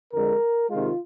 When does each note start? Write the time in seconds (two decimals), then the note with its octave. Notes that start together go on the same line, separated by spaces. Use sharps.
0.13 F2 D3 G#3 A#4
0.70 C3 D#3 G#3 F4